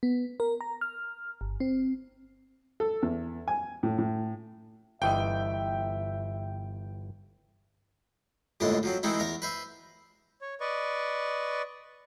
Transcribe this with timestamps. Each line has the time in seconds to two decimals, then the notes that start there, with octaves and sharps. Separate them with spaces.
0.03 B3
0.40 A#4
0.61 A#5
0.81 F6
1.41 G1
1.60 C4
2.80 A4
3.02 E2
3.48 G#5
3.83 A2
3.98 A2
5.02 G1 E3 D#5 E5 G5
8.60 A#1 F2 A2 D3 G#3 A5
8.83 F3 F#3 C4
9.03 D#3 E3 G#3 C4 D#4 E4
9.19 E2 A#4 A#5
9.42 B4 C5 E5
10.41 C#5
10.60 B4 D5 D#5 C#6